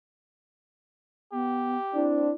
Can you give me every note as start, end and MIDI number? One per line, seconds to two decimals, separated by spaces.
1.32 1.77 59
1.32 2.08 67
1.94 2.30 60
1.94 2.30 62
1.94 2.35 64